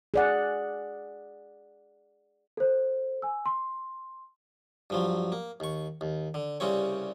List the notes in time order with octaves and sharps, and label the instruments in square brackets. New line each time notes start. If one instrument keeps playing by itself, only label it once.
[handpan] G#4 D5 F#5
[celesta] A4 C5
G#5 E6
C6
[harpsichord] G2 F3 F#3
A#3
D#2 C#6
D#2
D3
C2 C#3 G3 C4 C#5